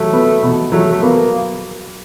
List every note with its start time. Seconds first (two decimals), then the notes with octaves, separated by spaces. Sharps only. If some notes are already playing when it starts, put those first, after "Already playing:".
Already playing: F#3 A3
0.13 B3
0.43 B2
0.72 F#3 A3
0.92 A3
1.02 A#3 B3